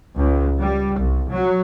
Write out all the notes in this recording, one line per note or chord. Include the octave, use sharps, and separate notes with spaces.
C#2
G3
C2
F#3